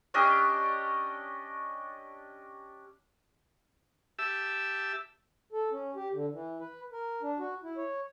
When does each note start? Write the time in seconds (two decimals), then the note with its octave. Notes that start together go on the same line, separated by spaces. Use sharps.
0.14 C#4 D4 G4 D#5
4.19 G4 E5 A5 E6
5.53 A4
5.71 C#4
5.96 G4
6.13 D3
6.33 E3
6.60 B4
6.92 A#4
7.22 D4
7.39 F#4
7.63 E4
7.77 C#5